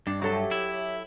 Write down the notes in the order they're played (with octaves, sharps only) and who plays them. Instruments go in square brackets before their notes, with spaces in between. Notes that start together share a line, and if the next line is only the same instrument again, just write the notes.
[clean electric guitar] G2 [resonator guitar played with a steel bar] D4
[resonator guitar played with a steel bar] F#3 A4 A5 [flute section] G4 C#5 E5
[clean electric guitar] E4